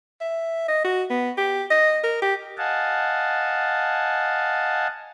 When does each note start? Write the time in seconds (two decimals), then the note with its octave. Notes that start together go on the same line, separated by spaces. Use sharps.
0.21 E5
0.68 D#5
0.84 F#4
1.10 B3
1.38 G4
1.70 D#5
2.03 A#4
2.22 G4
2.58 D#5 F5 F#5 G#5 A5